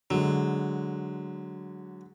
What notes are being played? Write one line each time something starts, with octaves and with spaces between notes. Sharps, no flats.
D3 F#3 G#3